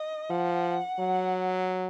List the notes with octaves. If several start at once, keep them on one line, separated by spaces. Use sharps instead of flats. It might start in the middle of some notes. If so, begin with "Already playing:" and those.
Already playing: D#5
F3 F#5
F#3